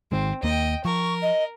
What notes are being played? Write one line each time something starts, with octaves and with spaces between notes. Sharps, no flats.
G#1 D#3 G#3 C4
D#2 A#3 D#5 G5
F3 A#4 C#6
D#5